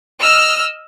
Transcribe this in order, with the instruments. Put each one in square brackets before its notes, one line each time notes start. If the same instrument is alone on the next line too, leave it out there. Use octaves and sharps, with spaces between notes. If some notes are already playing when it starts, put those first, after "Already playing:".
[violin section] D#5 E6 F6